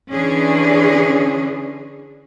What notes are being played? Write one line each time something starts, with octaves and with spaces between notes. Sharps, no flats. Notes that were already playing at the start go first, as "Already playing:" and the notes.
D3 E3 C#4 D4 G#4